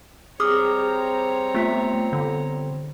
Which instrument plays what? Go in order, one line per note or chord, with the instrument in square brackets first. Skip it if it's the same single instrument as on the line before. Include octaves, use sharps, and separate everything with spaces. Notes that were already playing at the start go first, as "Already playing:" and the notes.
[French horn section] G3 C4 [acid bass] G#4 [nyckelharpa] C#5 A#5 [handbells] D6 D#6 F6
[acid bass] A3 [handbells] B3 F4 B6
[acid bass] D3